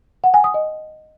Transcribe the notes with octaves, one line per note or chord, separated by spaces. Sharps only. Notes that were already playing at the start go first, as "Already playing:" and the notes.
F#5
G#5
D#6
D#5